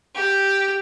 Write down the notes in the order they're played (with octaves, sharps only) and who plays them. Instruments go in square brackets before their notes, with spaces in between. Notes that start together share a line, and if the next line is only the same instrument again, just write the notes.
[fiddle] G4